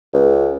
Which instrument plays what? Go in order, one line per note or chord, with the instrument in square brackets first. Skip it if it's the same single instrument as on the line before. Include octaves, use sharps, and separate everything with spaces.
[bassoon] C#2